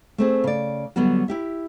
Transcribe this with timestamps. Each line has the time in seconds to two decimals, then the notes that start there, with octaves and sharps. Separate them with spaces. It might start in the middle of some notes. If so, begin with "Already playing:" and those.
0.18 A3 C4 G#4
0.44 C#3 D5
0.96 D3 F#3 G3 B3 F#4
1.28 E4 G4 E5